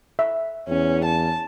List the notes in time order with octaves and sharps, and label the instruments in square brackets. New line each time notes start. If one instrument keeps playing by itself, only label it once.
[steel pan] E5
[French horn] E2 [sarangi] C#4
[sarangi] A5